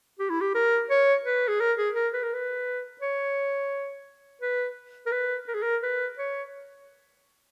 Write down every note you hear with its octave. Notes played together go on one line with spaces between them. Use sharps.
G4
E4
G4
A#4
C#5
B4
G#4
A#4
G#4
A#4
B4
A#4
B4
C#5
B4
A#4
B4
A#4
G#4
A#4
B4
C#5